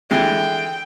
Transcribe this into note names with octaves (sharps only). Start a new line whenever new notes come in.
D3 E3 G#3 G5